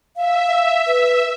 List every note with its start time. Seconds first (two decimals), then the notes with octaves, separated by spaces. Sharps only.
0.16 E5 F5
0.87 B4